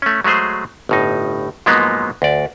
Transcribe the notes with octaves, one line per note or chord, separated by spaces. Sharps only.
A3 C#4
F#3 G#3 A3 G#4 C5
G1 A2 D#4
G#2 F3 F#3 G#3 A#3 B3
D2 D5